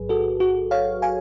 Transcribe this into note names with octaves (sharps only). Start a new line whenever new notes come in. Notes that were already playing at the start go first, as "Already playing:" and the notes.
Already playing: A1 G#2 F#3 G#4 B4
F#4 A4
F#4
C#5 F5
F5 G#5